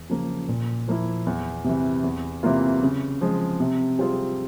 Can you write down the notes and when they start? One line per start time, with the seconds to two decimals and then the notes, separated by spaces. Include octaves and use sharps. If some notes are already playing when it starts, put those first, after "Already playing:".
Already playing: E2
0.10 C#3 F3 A#3
0.48 A#2
0.88 F3 A#3 E4
1.27 E2
1.64 C3 E3
2.04 E2
2.43 C3 E3 A#3 F4
2.82 C#3
3.21 F3 G#3
3.60 C3
3.99 G3 C4 F4 G#4